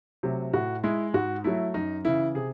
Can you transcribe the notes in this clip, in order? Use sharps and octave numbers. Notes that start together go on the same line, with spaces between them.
C3 F#3 A3
A2 F#4
G#3 E4
G#2 F#4
F#3 A3 E4
F#2 D#4
C#3 E3 E4
C3 G#4